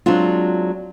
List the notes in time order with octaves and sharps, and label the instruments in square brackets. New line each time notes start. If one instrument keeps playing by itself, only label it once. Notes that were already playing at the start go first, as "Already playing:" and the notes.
[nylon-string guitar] F#3 G#3 C4 D4 F4